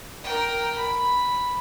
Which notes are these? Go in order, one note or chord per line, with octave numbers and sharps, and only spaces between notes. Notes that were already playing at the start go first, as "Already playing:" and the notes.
A#4 G5
B5